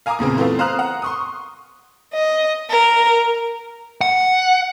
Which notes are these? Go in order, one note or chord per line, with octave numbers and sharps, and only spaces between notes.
F5 G#5 A#5 D6 D#6
E2 A#2 C#3 C4
E3 A3 B3 C4 F4
C5 F5 A#5 D#6 F6 F#6
F#5 A#5
C6 C#6 D#6
D#5
A#4
F#5